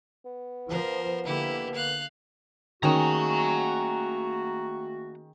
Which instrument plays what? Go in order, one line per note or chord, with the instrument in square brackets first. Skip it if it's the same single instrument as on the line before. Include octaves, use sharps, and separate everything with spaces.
[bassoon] B3
[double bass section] F3 [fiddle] A#4 C5
[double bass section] D3 A#3 [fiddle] E4 G4
[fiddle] F5 F#6
[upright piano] D#3 [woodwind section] A3 A#3 F#4 [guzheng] C#4 G#4 [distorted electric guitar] F#5 A#5